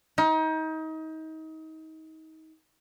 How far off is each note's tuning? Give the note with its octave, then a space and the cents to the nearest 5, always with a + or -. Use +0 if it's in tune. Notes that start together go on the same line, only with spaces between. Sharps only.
D#4 +30